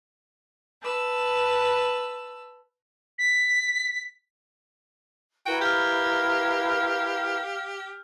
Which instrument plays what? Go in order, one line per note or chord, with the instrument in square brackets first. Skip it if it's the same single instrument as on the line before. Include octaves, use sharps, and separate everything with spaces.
[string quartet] B4 A5 E6
[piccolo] B6
[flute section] E4 A#4 B4 [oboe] F#4 [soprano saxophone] G5
[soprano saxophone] G4 [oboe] F5 [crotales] F6 G6